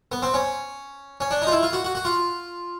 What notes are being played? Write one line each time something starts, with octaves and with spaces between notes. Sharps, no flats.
B3
C4
C#4
C#4
D4
D#4
F4
E4
F4
F#4
F#4
F#4
F4